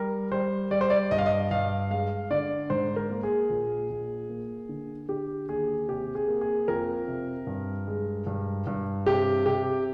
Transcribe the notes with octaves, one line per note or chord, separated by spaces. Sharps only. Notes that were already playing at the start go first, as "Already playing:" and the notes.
Already playing: G3 A#4
G3 C5
G3 D5
C5
D5
G2 D#5
F5
D#5
G2 F5
G#3 F5
D3 D5
G#2 C5
A#4
A#3
G#4
A#1
A#1
A#3
D3
D3 G4
D#2 G#4
C3 G4
G#4
A#3
G#4
F2 A#4
C3
G2
G#3
G2
G2
C3 G4
C3 G4